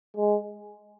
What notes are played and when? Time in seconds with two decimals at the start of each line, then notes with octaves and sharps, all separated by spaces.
0.17 G#3